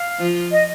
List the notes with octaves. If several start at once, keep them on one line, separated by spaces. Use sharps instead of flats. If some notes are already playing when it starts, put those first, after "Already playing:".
Already playing: F5
F3 F4
D#5